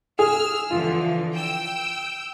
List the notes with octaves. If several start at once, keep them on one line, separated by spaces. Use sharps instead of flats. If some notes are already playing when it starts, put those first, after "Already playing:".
G#4 E6 F6
D3 E3 F3 F4
G5 E6